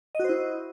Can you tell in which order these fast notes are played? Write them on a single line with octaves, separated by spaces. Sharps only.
D#5 F#4 C5 E4